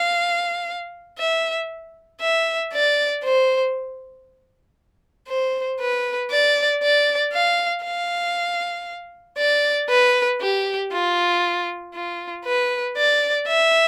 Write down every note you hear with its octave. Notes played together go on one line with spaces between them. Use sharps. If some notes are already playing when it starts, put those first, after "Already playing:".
Already playing: F5
E5
E5
D5
C5
C5
B4
D5
D5
F5
F5
D5
B4
G4
F4
F4
B4
D5
E5